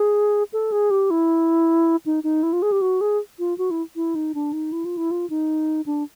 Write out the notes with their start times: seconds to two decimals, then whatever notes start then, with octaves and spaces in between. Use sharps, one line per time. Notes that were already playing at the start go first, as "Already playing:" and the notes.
Already playing: G#4
0.53 A4
0.72 G#4
0.91 G4
1.11 E4
2.06 D#4
2.24 D#4
2.43 E4
2.53 F4
2.62 G#4
2.72 G4
2.81 F#4
3.01 G#4
3.39 F4
3.58 F#4
3.71 E4
3.96 E4
4.15 D#4
4.35 D4
4.53 D#4
4.72 E4
4.85 F4
4.97 E4
5.11 F4
5.30 D#4
5.86 D4